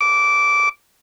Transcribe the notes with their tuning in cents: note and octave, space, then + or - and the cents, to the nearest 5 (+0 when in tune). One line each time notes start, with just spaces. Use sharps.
D6 -15